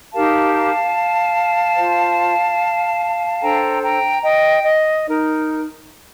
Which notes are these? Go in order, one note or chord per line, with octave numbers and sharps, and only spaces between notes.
D#4 G4 A#4 F5 A5
F4 C5
D4 A4 C5 G5 A#5
G5 A#5
D#5 G5
D#5
D#4 A#4